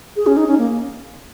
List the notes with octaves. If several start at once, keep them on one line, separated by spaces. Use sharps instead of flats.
G#4
C#4
D#4
C#4
A#3